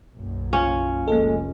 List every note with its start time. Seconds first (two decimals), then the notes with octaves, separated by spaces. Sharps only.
0.13 F#1 B1 F#2
0.53 C#4 F4
1.08 F1 F3 G#3 A#3 A4